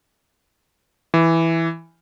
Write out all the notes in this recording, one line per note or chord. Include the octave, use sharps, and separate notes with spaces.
E3